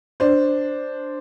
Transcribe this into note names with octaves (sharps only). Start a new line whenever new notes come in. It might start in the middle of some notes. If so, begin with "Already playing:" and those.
D4 C5